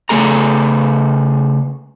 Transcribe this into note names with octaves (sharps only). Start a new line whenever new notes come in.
C#3 A3 G#4 A4 A#5